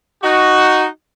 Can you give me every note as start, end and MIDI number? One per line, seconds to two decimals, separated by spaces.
0.23 0.86 63
0.23 0.86 66